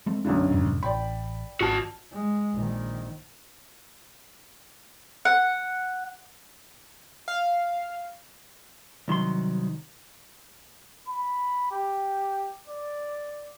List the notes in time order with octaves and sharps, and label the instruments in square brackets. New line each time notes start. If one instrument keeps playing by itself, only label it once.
[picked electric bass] G#3 A3 C4
[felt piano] B1 F#2 D3
[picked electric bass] F2 G#2 C3
[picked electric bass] A1 [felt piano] D5 G5 B5
[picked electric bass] G#1 [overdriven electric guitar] F#4 A5
[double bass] G#3
A#1 D#3
[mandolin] F#5
[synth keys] F5
[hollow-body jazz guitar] C2 D#3 F#3 C6
[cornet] B5
G4
D5